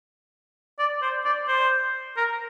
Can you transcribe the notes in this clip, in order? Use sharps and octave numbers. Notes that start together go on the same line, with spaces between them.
D5
C5
D5
C5
A#4